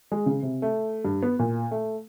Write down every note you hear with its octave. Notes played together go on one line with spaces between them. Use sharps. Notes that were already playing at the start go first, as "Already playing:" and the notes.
G#3
C#3
C3
A3
G2
B3
A#2
A3